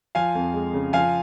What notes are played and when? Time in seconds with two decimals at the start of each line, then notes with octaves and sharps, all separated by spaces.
0.15 F3 F5 G#5
0.35 F2
0.54 G#3
0.73 C#3
0.93 F3 F5 G#5